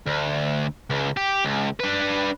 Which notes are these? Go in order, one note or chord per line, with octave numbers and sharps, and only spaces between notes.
D2
C#2
G4
C#2
D4 B4